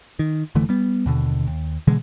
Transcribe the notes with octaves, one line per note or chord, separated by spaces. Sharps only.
D#3
F1 D3 E3 A3
G3 B3
D#2 B2 D3
D#2
B2 D3 E3 G#3